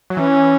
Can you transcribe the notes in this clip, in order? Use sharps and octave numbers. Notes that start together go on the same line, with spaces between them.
F#3
E3 C#4